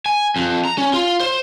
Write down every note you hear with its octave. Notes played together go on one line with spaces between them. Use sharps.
G#5
F2
A#5
C#4
F4
C5